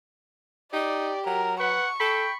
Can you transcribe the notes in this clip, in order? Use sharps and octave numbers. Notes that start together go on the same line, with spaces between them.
D#4 G4 D5
F#3 A#4
B4 F#5 C#6
A4 G5 B5